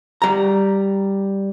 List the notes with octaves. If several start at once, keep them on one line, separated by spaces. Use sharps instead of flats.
G3 A#5